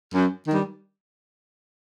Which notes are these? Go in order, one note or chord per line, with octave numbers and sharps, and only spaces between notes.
F#2
D#3 G3